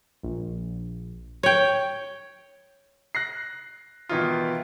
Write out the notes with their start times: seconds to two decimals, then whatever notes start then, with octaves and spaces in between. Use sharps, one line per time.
0.23 A#1
1.43 C#5 G5
3.15 F#6 A#6 C7
4.09 B2 D#3 E3 D#4 F4